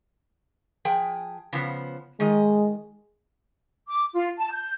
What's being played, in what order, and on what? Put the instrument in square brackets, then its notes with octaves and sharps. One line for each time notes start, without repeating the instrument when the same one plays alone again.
[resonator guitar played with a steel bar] F3 G#4 G5
C#3 F3 B3
[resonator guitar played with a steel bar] D#3 D#5 [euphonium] G#3
[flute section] D6
F4
A5
G6